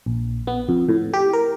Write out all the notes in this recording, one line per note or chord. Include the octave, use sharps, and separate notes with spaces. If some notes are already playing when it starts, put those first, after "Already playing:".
A#1
B3
F2
A2
G4
A#4